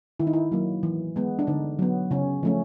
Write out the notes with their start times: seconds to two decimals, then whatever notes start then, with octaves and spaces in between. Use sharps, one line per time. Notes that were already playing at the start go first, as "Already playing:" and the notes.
0.20 D#3 E4
0.27 D#4
0.33 E4
0.52 F#3 A#3
0.83 E3
1.16 G#3 B3
1.39 D4
1.47 D3 D#4
1.79 F#3 B3
2.11 C#3 C#4
2.43 F3 A3 C#4